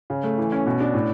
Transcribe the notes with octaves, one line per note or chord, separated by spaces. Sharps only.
C#3
A3
E3
C#4
B2
D4
A2